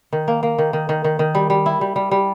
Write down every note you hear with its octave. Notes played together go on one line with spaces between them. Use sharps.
D#3
A#3
A#3
D#3
D#3
D#3
D#3
D#3
G3
G3
E4
G3
G3
G3